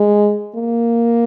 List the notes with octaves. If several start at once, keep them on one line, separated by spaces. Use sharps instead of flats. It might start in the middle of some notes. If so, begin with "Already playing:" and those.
Already playing: G#3
A#3